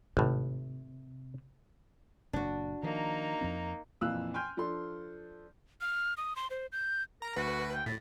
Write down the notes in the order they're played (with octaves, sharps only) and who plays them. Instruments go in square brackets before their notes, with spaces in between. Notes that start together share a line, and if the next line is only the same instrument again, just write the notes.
[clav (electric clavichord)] G#1 A2 [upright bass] C3
[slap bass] F#1 A#2 [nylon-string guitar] D4 F#4
[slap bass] D#3 F3 [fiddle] A#3 D#4
[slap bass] F2 F3 C4
[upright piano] F2 A#2 E3 F5 E6 F#6
G5 G#5 C6 F6 G6
F3 D4 A4 C6
[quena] F6
D#6
C6
C5
G6
[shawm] A#4 [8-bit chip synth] A#5
[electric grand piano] D2 [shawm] F#4 [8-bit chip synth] B4
[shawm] G5
[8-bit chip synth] A2 [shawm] A5 [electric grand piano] A#6 B6